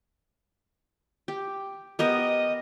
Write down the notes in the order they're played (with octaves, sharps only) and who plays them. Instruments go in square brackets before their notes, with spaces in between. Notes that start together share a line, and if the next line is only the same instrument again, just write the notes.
[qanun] G4
[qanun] B3 G4 A#4 [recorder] D#5